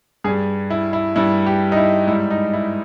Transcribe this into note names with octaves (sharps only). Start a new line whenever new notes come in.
G2 G3 G#4
E4
E4
G2 G3 E4
G4
D#4
E4
G#2 G3 E4
D#4
E4